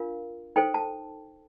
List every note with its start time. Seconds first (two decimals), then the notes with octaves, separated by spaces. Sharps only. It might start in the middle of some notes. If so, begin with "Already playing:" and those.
Already playing: D4 F4 A#4 F5
0.56 D#4 A4 C5 G5
0.74 A5